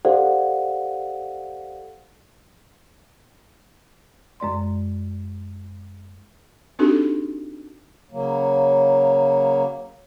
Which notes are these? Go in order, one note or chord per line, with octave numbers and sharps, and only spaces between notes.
G4 A4 C5 D5 F5 F#5
F#2 G#3 D5 C6
C4 D4 D#4 F#4 G4 A4
C#3 F#3 A#3